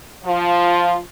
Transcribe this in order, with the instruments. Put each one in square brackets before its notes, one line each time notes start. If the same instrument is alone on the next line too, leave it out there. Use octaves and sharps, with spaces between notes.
[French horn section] F3 F4